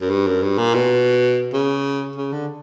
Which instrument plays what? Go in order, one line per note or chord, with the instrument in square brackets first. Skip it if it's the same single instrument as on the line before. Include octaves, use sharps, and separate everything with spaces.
[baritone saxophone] F#2
G2
F#2
G2
A#2
B2
C#3
C#3
D3